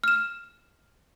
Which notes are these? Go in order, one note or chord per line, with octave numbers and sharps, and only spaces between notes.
F6 E7